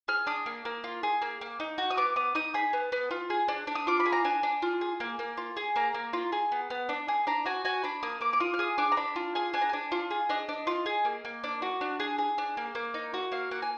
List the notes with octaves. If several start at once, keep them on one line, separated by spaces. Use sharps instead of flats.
G#4 F6
D4 D#6
A#3
A#3
F4
G#4
A#3
A#3
D#4
F#4
D#6
B3 D6
B3 D#6
D#4 D#6
G#4 B5
B3
B3
F4
G#4
D4
D4
D#6
F4 D6
B5
G#4
A#5
D4 G#5
D4
F4
G#4
A#3
A#3
F4
G#4
A#3 A#5
A#3
F4
G#4
B3
B3
D4
G#4
D4 A#5
F#4 G#5
F#4 G#5
D4 B5
A#3 D#6
A#3 D6
D6
F4 D#6
F6
G#4 D#6
D4 D6
A#5
D4 B5
F4
G#4 G#5
D4 G#5
A#5
D4 G#5
F4
G#4
D4 D#5
D4
F4
G#4
A#3
A#3
D4
F#4
D4
G#4
G#4
D4
A#3
A#3
D#4
F#4
A#3 F5
A#3 F#5
G#5